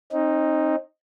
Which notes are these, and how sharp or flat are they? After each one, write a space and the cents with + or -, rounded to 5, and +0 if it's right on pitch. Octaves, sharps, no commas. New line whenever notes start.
C4 +40 D#4 +0